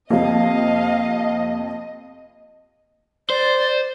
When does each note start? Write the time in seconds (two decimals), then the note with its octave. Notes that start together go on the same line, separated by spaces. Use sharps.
0.10 F2 C3 F3 A#3 D#5 F5
3.30 C5 D5